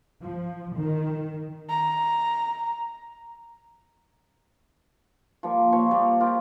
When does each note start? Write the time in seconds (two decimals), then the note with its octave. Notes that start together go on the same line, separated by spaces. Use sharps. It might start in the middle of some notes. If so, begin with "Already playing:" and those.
0.22 F3
0.76 D#3
1.70 A#5
5.43 F3 G3 A#3
5.72 A#2 F3 C#5
5.91 G3
6.20 F4 G4 A#4